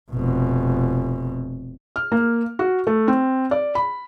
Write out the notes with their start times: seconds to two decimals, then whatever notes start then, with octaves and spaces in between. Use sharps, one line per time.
0.12 F1 B2
1.96 F6
2.12 A#3
2.59 F#4
2.87 A3
3.08 C4
3.51 D5
3.75 B5